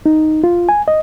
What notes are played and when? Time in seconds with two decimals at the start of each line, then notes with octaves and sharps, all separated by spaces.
0.06 D#4
0.44 F4
0.69 G#5
0.88 D#5